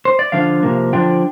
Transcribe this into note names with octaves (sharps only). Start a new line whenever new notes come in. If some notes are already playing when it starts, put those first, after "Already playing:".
C5
D5
D3 F3 D4 F4 F5
C3 F3 A#3
D3 F3 A#3 D4 F4 G5